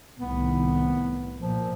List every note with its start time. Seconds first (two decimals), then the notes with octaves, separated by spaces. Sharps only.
0.19 C2 A2 D#3 B3
1.39 A#2 F3